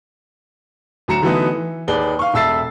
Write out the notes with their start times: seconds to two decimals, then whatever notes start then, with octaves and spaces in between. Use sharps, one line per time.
1.08 D2 F#3 A#5 C#7 E7
1.22 D3 E3 F#3 A3 B3 D#4
1.55 E3
1.88 D#2 G#4 B4 D5 G7
2.19 F5 C#6
2.33 E1 A4 E5 E6 A6 C7